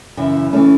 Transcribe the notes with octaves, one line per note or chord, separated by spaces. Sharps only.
F#2 C#3 E3
E3 A3 C#4